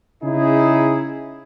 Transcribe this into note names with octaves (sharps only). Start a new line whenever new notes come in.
C#3 D#4 E4 G#4